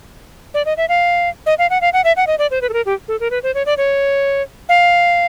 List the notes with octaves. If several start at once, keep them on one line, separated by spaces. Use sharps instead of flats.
D5
D#5
E5
F5
D#5
F5
F#5
F5
F#5
E5
F#5
D#5
D5
C5
B4
A4
A#4
G4
A4
A#4
B4
C5
C#5
D5
C#5
F5